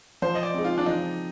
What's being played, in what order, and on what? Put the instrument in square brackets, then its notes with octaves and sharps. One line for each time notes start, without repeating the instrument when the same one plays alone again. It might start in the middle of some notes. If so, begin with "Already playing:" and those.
[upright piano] F3 [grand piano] C5
[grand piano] D#5
D5
[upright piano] G#3 C4 [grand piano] D#4
[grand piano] F4
D4
[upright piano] F3 [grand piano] D#4